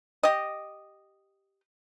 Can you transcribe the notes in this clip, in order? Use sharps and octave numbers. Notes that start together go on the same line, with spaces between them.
G4 D#5